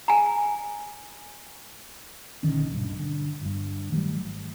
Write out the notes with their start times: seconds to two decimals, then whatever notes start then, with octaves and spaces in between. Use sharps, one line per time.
0.08 G#5 A#5
2.43 A#1 D3 D#3 C#4
2.69 D#1 B1 G2
2.99 D3
3.41 G1 G2
3.92 D#3 F#3 G3 A3
4.15 G#1